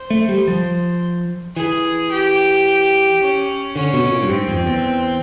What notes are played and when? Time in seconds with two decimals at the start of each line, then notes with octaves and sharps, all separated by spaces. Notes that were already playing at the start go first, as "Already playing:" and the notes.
Already playing: C5
0.10 A3
0.29 G3
0.48 F3
1.56 E3 G#4
2.11 G4
3.21 C#4
3.76 D3 C#4
3.93 B2
4.04 B2
4.11 A#2
4.23 G2
4.30 G#2 C4
4.48 F2
4.66 E2